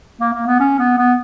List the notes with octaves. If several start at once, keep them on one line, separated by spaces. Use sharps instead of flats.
A#3
A#3
B3
C#4
B3
B3